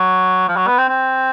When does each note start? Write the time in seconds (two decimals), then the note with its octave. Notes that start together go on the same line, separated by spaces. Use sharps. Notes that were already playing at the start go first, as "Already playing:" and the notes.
Already playing: F#3
0.48 F3
0.56 F#3
0.67 B3
0.78 C4
0.89 C4